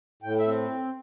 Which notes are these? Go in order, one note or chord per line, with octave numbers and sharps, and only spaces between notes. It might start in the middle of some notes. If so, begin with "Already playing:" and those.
A2 G5
E5
C4